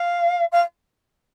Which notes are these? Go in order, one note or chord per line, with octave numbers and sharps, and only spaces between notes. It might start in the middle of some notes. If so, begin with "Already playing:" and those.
Already playing: F5
F5